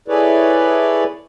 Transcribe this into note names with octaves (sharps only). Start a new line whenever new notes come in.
E4 G#4 A4 B4 C#5 D5